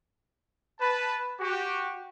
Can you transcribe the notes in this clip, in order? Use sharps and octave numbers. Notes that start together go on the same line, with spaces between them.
B4 A5
F#4 G4